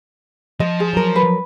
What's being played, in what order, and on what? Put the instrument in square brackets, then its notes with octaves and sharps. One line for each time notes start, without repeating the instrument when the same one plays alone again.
[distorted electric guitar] F3 [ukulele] D#5
[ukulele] G#4
[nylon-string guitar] F#3 A#4
[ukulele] B4